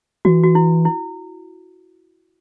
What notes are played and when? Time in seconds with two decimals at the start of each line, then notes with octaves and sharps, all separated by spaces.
0.25 E3 F#4
0.44 F#4
0.55 E4
0.85 E4